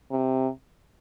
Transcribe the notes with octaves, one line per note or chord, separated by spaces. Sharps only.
C3